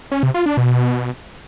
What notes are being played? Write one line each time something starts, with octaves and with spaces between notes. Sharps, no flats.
C#4
C3
F4
D4
B2